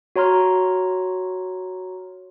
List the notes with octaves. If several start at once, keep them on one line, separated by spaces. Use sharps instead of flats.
F#4 C#5 A#5 C6 F6